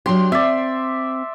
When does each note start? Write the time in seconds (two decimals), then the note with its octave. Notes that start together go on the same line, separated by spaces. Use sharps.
0.06 F#3 D4 G4 C6
0.32 C4 D5 E5